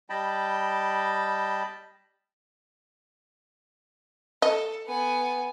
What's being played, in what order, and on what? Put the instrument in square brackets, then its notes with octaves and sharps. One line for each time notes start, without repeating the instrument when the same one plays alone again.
[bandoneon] G3 D#5 G5 A5 B5
[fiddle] A4 [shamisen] D#5
[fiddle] B3 G#5